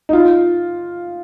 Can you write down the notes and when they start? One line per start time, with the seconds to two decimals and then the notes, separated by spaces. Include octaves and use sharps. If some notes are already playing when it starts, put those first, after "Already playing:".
0.09 D#4
0.13 F4